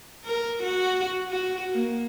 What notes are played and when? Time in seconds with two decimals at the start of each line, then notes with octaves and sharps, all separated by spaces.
0.24 A#4
0.63 F#4
1.29 F#4
1.72 A#3